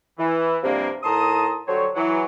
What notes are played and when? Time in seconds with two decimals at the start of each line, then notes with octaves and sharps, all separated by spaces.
0.18 E3
0.63 G2 C3 F3 A#3
1.03 A2 D#3 A5 A#5 C6 D#6
1.67 D3 F#3 G3 A4 C5 C#5
1.96 E3 F#3